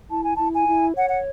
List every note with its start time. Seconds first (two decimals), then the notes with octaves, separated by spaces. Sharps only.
0.10 E4 A5
0.23 G#5
0.35 E4 A5
0.54 G#5
0.67 E4
0.97 C#5 F#5
1.08 F#5